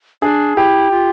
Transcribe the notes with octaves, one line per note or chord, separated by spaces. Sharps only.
D4 G#4
E4 G4
F4